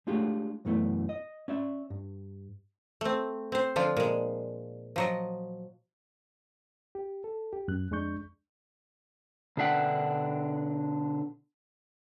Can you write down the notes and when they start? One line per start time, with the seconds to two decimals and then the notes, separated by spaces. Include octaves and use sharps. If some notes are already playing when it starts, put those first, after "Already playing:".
0.07 G#3 A3 D4 F4 G4 G#4
0.65 B1 F#2 E3 A3 B3 E4
1.09 D#5
1.48 C#4 D5 E5
1.90 G2
3.01 A3 C4
3.52 C4 C5
3.76 D3 F3 D4 F4
3.97 A#2 G#3
4.96 F3 F#3 D#5
6.95 G4
7.24 A4
7.53 G4
7.68 F#2 F#6
7.91 F2 G#3 D4 C#6 G6
9.57 B2 D3 D4 E5 F#5 G5